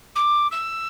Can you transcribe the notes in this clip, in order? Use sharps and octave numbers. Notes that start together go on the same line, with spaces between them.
D6
E6